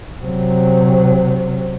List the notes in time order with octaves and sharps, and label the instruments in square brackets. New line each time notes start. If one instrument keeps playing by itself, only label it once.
[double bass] C3 F#3